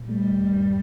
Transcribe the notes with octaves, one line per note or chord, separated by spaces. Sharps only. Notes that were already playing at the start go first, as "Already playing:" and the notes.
Already playing: A#2
G3 A3
D#2
G2